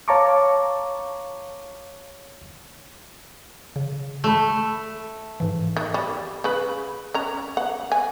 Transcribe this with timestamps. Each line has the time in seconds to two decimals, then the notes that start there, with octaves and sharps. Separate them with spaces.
0.08 C#5 F5 A5 A#5 C#6 D6
3.76 C#3
4.24 A3 B5 E6
5.40 G#2 E3
5.77 D#3
5.94 G3
6.44 C#3 B4
7.14 C#4 A#5
7.57 F#5
7.92 G#5